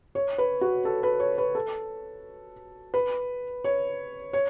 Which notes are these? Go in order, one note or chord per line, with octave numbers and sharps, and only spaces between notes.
C#5
B4
F#4
A4
B4
C#5
B4
A4
B4
C#5
C#5